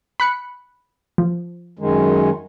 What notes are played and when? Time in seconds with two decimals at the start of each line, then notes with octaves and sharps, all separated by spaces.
0.20 B5 F#6 C#7
1.18 F3
1.79 F#2 D#3 G#3